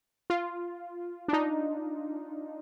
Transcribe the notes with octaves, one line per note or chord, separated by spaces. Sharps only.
F4
D4
D#4